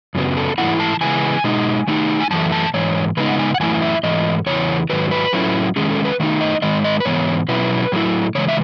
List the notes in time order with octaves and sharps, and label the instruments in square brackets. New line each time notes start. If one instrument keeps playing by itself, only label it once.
[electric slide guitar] F#2 C#3 F#3 B3
A4
G#2 E3 A3 C#4 E4 F#5
A5
C#3 E3 G#3 B3 G#5
B2 G#3 D#4
D#3 A3 D#4
G#5
F#2 E3 A3 A5
A5
G#2 E3 C#5
C#3 G#3 B3 D#4 B4
F#5
G#5
F#5
F#2 E3 A3 E4 G#5
E5
G#2 E3 A3 D#5
E2 C#3 E3 C#5
G#2 D#3 F#3 B4
B4
A2 F#3 A3 C#4 E4
D#3 G#3 C#4 G#4
A4
B4
D#3 A3 D#4
D#5
G#2 D#3 G#3 D#5
D#5
B4
G#2 E3 B3 C#5
B2 F#3 C#4 E4 B4
A2 F#3 A3 E4
C#3 E3 G#3 C#5
E5